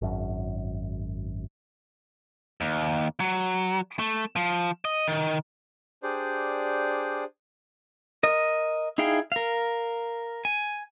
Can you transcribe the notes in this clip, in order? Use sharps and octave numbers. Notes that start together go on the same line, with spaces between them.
G#1 F#2
D#2
F#3
A3
F3
D#5
D#3
D4 G4 G#4 C5 D5
A#4 D#5
D#4 E4 G#4 F5 G5
A#4 F5
G#5